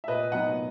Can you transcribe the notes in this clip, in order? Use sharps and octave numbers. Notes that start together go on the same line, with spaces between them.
E5
A#2 B4 D#5
F#3 B3 D#4 D#5 F#5